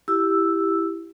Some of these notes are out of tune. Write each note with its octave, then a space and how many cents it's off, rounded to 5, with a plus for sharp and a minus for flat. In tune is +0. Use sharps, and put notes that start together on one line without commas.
E4 +10 G4 +0 E6 +0